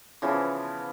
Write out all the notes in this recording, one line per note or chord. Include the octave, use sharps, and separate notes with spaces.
C#3 E3 F3 B3